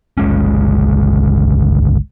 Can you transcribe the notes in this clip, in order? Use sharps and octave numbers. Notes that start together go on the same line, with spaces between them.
G1 C#2 G#3 C#4